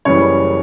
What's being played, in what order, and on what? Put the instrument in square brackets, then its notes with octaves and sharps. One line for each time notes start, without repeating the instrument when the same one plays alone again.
[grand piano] F#1 F#2 C#3 E3 G3 C#5